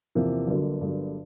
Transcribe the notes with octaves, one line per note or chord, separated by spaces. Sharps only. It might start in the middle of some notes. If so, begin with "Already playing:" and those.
E2 C3 F3 A#3
G1 G2 D3 F#3 A#3
G1 G2 D3 F#3 A#3